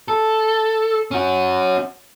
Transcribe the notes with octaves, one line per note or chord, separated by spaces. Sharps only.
A4
C#4 F#4